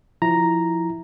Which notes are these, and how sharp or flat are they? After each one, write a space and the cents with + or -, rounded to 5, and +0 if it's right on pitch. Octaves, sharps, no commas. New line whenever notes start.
F3 +5 E4 +0 A#5 +0